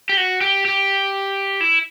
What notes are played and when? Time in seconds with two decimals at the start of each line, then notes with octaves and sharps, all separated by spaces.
0.09 G4
0.17 F#4
0.41 G4
0.66 G4
1.61 E4